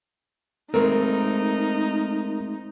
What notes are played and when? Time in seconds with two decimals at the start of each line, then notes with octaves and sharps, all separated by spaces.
0.74 G#3 A3 C4 D#4 A#4